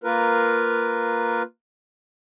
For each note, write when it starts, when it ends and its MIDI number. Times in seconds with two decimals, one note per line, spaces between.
0.04 1.42 58
0.04 1.42 65
0.04 1.42 70
0.04 1.42 71